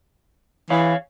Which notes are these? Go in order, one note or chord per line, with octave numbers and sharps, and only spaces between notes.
E3 C#5 F5